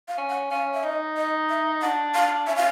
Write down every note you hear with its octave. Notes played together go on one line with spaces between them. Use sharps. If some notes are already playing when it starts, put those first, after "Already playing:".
F5
C#4
F#5
C#4 F5
E5
D#4 D#5
D#5
E5
D4 F#5
F5
C#4 E5
F5